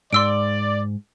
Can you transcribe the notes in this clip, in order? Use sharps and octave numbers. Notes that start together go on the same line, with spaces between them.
G#2 D5 C6 E6 D7